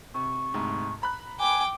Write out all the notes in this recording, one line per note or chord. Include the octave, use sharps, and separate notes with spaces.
C3 C#6
D2 G#2 C3
A#5 B5 F#6
G5 G#5 D6